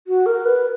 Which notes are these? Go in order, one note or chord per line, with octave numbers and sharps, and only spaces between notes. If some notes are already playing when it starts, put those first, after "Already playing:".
F#4
A#4
B4